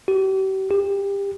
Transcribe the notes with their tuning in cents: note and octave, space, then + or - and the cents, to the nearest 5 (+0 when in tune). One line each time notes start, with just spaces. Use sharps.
G4 -40
G4 +25